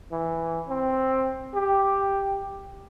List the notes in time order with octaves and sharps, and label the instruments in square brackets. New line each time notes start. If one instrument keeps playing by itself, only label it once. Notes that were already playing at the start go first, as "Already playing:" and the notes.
[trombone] E3
C4
G4